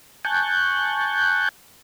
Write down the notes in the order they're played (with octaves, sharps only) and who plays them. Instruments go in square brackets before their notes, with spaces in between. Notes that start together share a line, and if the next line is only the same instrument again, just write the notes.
[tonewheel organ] G#5 A5 C#6 F#6 G6